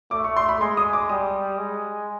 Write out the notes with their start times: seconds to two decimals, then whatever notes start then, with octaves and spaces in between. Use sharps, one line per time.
0.11 A3 D6
0.24 C#6
0.36 C6
0.49 B5
0.61 G#3 C6
0.77 D#6
0.93 D6
1.09 G3 D#6
1.58 G#3